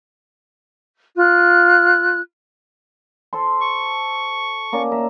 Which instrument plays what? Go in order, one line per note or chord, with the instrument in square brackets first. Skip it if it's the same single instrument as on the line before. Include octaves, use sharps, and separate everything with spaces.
[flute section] F4 F#6
[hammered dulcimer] A4 C5 C6
[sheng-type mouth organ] C#6
[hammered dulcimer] A#3 C#4 D5
A#4 E5